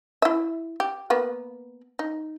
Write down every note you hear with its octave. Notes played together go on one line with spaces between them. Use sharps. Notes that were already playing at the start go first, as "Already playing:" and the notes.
E4 E5
G4
A#3 B3 B4
D#4